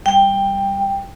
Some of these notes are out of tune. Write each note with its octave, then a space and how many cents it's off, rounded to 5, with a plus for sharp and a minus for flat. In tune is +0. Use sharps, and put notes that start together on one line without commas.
G3 +0 G5 +10